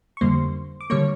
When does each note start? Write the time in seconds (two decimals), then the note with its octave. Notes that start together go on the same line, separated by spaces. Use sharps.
0.17 C#6
0.21 F2 D3 G3 A#3 C5 C6
0.81 D6
0.90 D3 G3 A#3 C#5 C#6